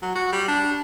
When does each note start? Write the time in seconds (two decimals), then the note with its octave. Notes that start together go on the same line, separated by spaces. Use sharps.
0.02 F#3
0.15 F#4
0.32 G3
0.48 D4